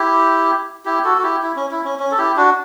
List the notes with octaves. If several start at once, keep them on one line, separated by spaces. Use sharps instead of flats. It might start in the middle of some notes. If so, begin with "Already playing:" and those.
Already playing: E4 G4
E4 G4
F#4 A4
F#4
E4 G4
E4
C#4
E4
C#4
C#4
A4
E4 G4
D4 F#4